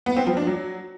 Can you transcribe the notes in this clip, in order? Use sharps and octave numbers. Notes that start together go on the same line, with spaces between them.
B3
C4
F3
D4
F#3